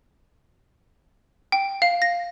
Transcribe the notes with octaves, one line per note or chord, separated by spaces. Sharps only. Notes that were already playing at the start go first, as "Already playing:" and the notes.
G5
F5
A#6